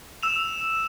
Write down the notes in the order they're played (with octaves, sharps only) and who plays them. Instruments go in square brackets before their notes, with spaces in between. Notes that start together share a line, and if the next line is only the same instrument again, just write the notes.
[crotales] E6 E7 F7